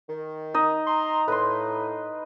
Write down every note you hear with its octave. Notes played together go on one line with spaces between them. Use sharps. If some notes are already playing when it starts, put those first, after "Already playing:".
D#3
D#4 D#5
A#5 C6
A2 B4 C6